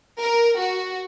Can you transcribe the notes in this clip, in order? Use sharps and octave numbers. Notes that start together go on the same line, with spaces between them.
A#4
F#4